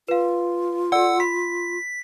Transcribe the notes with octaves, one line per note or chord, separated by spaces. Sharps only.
F4 B4 F5
A4 D5 F#5 E6
B5 B6